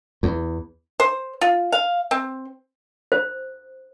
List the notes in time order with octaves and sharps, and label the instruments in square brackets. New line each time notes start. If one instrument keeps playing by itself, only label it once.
[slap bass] E2
[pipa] C5
F4
F5
C4
[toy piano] C5